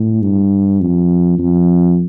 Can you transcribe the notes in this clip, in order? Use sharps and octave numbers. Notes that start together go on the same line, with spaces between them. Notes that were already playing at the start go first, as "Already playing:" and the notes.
Already playing: A2
G2
F2
F2